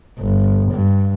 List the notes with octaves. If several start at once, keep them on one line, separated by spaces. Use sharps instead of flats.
G1
G2